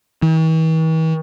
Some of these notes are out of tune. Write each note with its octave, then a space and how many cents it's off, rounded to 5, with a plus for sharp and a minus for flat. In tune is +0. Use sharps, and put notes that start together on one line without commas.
E3 -45